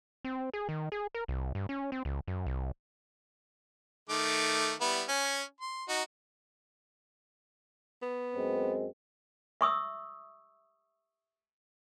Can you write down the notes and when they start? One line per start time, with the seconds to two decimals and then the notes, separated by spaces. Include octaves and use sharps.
0.25 C4
0.54 G#4
0.69 D#3
0.92 G#4
1.15 A#4
1.28 C2
1.55 G2
1.69 C#4
1.92 C4
2.05 C#2
2.28 F#2
2.46 C2
4.09 D#3 A3 D6
4.81 G3 B3 E4
5.08 C#4 G#5
5.61 C6
5.89 D#4 F#4
8.02 B3
8.35 F#2 G#3 C4
9.61 E5 C#6 D#6 E6